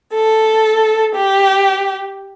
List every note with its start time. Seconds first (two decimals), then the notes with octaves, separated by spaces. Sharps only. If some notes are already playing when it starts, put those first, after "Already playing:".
0.14 A4
1.15 G4